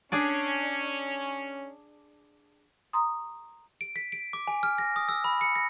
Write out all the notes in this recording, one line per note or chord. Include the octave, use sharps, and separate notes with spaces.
C#4 D4 G#4 D5
A#5 C6 D#6
D7
B6
D7
D6
G#5
F6
A#6
D#6
E6
B5
C#7
A#6